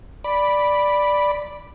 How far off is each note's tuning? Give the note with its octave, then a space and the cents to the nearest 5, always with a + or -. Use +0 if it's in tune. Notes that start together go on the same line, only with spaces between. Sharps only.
D5 +0 B5 -5